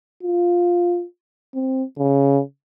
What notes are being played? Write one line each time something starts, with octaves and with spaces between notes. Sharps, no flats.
F4
C4
C#3